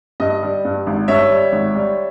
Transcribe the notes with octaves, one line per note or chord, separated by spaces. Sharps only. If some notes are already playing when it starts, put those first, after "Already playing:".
G2 D#5
G3
G2
G#1
G2 C#5 E5
G3
G#1
G3